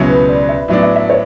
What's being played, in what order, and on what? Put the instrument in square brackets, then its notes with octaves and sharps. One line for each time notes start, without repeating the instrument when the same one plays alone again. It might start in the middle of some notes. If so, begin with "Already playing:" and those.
Already playing: [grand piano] C#2 B2 F#3 C#4 E4
[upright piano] B4
D5
E5
[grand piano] A2 F#3 B3 D4 [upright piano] E5
[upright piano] E5
E5
C#5